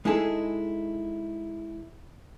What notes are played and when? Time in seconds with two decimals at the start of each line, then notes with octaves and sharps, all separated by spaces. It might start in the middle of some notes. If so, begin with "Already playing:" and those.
0.05 G#3 D#4 E4 G#4 A4